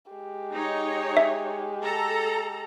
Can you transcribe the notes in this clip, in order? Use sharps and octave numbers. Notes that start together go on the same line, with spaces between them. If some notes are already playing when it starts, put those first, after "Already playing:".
G#3 G4
D#4 C#5
E5
A4 A#5